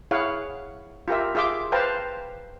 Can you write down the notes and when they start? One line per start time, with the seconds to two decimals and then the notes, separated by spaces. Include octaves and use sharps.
0.11 E4 G#4 C#5 F5 F#5
1.08 F4 G4 A#4 E5
1.35 F4 G#4 E5 C6 D6
1.72 B4 C5 F5 G5 A5 A#5